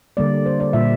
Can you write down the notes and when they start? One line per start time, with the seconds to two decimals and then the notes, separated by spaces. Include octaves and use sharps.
0.17 D3 G3 A#3 D5
0.46 C5
0.60 D5
0.73 A#2 G3 A#3 E5